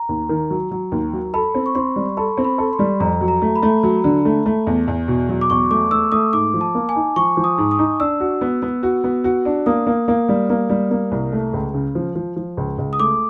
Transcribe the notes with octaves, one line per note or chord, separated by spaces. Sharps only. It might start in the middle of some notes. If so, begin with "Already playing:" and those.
Already playing: A#5
D#2
D#3
F#3
F#3
D#2
F#3
A4 B5
C4
C#6
C4 C6
G3
A4 B5
C4
B5
A4
C6
G3
F2 A#5
F#3
A#5
A3
B5
A3
F#3
D3
A3
A3
E2
E2
B2
F#3
D6
E2 C#6
A3 D6
A3 E6
A3 D#6
G#2 D6
F3
A5
A#3
G#5
D#4
F3 C#6
F3
D#6
G#2
D#6
D#4
D4 E6
F#4
B3
B3
F#4
B3
F#4
D4
A#3 D#6
A#3
A#3
G3
A#3
G3
A#3
C2
A3
C#2
C#3
F3
F3
F3
C#2
C#2
D#6
A3 D6